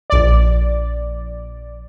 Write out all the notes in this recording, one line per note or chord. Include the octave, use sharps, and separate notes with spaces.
A#1 D5